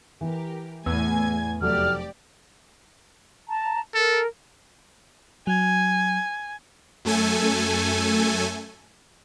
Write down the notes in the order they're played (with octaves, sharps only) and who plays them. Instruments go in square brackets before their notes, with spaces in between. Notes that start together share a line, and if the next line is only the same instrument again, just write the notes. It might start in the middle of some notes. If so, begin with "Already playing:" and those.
[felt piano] E3 [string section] G4 A#4
[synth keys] E2 [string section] A2 G#5 G#6 [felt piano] E6
[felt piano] F1 F#3 A3 [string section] G4 D5 [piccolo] F6
[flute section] A5 A#5
[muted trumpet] A4 [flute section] A#4
[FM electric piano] F#3 [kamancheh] G#5
[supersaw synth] F#2 A3 A4 G#5